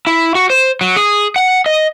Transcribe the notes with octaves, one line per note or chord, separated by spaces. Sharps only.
E4
F#4
C5
F#3
G#4
F#5
D#5